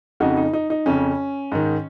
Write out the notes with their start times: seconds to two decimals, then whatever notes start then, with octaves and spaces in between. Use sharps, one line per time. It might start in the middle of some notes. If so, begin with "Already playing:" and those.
0.20 F2 C#3 D#4 F#4
0.37 D#4
0.53 D#4
0.70 D#4
0.86 F2 C#3 C#4
1.52 G#2 D#3